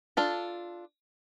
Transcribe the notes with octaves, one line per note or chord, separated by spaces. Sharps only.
D4 F4 A4